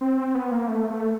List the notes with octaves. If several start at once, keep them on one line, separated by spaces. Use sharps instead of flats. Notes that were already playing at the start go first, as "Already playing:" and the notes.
C4
C4
B3
A#3
A3
A3